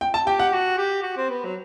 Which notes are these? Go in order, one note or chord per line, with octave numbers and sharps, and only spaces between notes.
G5
A5
G4 G5
F#5
F#4
G4
F#4
C4
B3
F#3